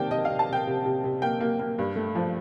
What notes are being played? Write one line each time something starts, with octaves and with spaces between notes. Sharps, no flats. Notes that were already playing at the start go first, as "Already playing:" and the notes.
Already playing: C3 D#3 A#3 D5 G5 A5
C3 D#5
C3 F5
A5
C3 G5
C3
C3
C3
A#3 G5
A#3
A#3
G2
A3
F3